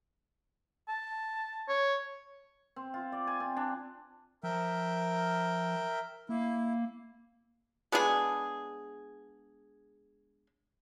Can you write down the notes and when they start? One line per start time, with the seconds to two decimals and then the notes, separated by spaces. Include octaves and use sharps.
0.89 A5
1.69 C#5
2.76 C4
2.94 F4
3.12 D5
3.27 G#5
3.40 C4
3.57 D4
4.43 F3 A#4 E5 G5
6.29 A#3 E4
7.92 G#3 B3 D4 G#4